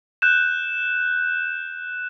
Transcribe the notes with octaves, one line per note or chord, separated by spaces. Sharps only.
F#6 G6 E7